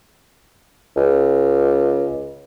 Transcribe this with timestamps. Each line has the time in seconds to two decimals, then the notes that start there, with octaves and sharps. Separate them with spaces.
0.96 C#2